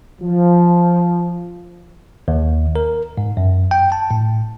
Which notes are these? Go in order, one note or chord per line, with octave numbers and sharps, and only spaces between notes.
F3
D#2
A#4
G#2
F#2
G5
A5
A2